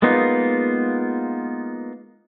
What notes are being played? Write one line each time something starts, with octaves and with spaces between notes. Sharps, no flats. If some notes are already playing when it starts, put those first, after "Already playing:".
G#3 A#3 B3 D#4 F4